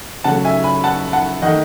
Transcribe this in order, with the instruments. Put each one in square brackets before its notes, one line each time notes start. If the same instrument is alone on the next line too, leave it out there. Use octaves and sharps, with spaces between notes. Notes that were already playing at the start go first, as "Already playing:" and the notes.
[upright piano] C#3 F#3 A3 F#5 A5
E5 G#5
G#5 B5
F#5 A5
F#5 A5
D#3 A3 D#5 F#5